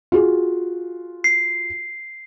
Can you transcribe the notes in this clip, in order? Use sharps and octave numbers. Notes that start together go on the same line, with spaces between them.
F4 F#4 G#4
C7